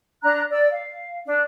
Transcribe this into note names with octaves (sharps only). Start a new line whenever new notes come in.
D4 A#5 F#6
D5 E6
F5
D4